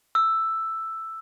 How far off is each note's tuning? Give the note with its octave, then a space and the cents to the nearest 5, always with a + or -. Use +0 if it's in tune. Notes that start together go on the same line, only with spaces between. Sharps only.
E6 +5